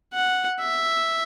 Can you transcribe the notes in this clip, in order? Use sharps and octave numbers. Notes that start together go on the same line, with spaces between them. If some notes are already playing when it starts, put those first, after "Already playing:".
F#5
E5